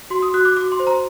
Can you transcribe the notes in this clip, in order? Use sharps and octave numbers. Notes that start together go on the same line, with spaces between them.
F#4 C6
D#6
F#4 F#6
D6
F#4 D6
C6
C5
A#5